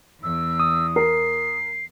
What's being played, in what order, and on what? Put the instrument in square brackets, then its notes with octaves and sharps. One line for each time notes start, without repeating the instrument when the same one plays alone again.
[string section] E2 [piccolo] E6
[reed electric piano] D#6
[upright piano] A#4 [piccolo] C7